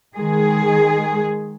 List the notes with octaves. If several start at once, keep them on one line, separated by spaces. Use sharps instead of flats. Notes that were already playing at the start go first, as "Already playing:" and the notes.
D#3 G#3 G#4